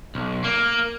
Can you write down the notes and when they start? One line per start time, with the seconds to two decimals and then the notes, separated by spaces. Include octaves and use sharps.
0.15 B1
0.44 A#3